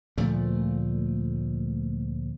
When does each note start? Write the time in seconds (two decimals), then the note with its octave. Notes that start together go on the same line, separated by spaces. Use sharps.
0.18 D2 A#2 F3 A3